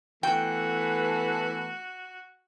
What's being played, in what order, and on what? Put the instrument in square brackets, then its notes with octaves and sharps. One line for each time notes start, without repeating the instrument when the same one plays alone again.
[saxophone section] E3 A3 B3 [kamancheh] F#4 [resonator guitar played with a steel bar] G5